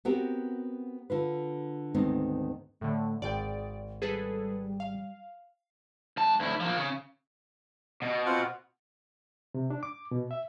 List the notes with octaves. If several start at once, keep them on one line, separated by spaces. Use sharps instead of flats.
B3 C4 F#4 G4 A#4
D3 F4 B4
D2 G#2 D#3 B3 C4 D#4
A2 D3 A3
G#1 G#4 D5 G5
G3 G#4 A4 B4
F5
G2 A5
D2 E4
F3 A#3
C#3
B2
C4 F4 F#5
C3
D4
D6
B2
E5